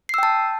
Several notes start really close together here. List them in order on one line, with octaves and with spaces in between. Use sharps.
C7 E6 G5 A5